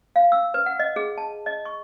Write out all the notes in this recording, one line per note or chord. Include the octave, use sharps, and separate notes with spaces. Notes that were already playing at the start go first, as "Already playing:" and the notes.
F5
E6
B4
F#5
D#5
G#4
A5
D#5
C#6